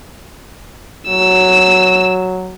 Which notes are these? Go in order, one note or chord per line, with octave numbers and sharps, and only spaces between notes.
F#3 E6